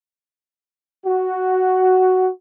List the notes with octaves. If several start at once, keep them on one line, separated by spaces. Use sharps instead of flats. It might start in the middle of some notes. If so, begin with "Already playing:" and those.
F#4